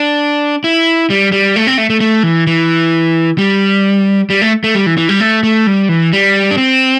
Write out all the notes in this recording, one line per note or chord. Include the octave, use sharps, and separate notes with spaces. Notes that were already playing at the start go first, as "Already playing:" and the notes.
Already playing: D4
E4
G3
G3
A3
C4
A3
A3
A3
E3
E3
G3
G3
A3
A3
G3
E3
E3
G3
A3
A3
G3
E3
G3
D4
C4